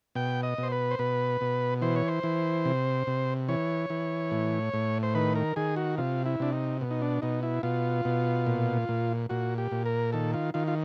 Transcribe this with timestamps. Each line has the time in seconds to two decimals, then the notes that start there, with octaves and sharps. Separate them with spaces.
0.15 B2 G5
0.43 D#5
0.58 B2
0.63 C5
0.72 B4
0.91 C5
0.99 B2 B4
1.41 B2
1.82 E3 C5
1.96 C#5
2.08 C5
2.23 E3
2.65 C3
3.07 C3
3.49 E3 C#5
3.90 E3
4.31 A2
4.74 A2
5.03 C5
5.15 D#3 B4
5.35 A#4
5.56 D#3 G#4
5.76 F#4
5.98 C3 F4
6.26 E4
6.40 C3 D4
6.53 D#4
6.81 B2
6.91 D#4
7.02 D4
7.22 B2 D#4
7.43 E4
7.63 B2 F4
8.05 B2
8.47 A#2
8.89 A#2
9.29 A#2 F#4
9.58 G4
9.71 A#2
9.86 A#4
10.13 D#3 A4
10.34 F4
10.54 D#3 F4
10.68 F4